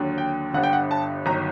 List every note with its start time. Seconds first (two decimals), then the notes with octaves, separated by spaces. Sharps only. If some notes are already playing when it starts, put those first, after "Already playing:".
Already playing: D#2 D3 F#3
0.18 G5
0.54 G1 G2 D3 F#5
0.63 G5
0.73 F#5
0.91 A5
1.26 G1 D#3 F#3 A#5